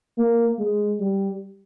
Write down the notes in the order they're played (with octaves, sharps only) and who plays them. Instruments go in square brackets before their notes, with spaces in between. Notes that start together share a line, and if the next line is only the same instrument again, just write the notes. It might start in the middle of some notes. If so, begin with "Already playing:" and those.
[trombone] A#3
G#3
G3